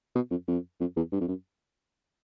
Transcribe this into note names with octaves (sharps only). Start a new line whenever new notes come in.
B2
F2
F2
F2
E2
G2
F2
F#2